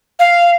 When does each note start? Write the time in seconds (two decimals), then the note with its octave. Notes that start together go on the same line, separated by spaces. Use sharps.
0.19 F5